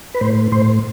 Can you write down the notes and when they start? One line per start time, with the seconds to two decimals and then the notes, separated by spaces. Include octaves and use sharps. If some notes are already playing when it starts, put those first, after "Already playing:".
0.15 B4
0.21 A2 C5
0.52 A2 C5